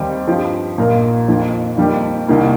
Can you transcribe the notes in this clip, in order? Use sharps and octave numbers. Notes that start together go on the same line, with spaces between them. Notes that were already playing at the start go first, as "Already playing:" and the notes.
Already playing: D#2 D#3 G3 C4 D#4
G2 F3 D#4 G4
A#1 A#2 A#3 D#4 A#4
F2 D#3 A#3 F4
F2 D#3 G3 A#3
C2 C3 D#3 A#3